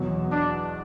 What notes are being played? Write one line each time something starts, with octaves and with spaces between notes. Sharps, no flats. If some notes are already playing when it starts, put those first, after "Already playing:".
Already playing: E2 B2 F#3
D4